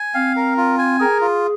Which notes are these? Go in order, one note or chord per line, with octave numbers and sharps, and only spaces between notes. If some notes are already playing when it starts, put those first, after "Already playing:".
Already playing: G#5
C4 F5
A#4
F4
G#5
G#4 A#4
F4